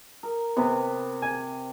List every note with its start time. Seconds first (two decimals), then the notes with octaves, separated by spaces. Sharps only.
0.23 A#4
0.57 C3 B3
1.22 G#5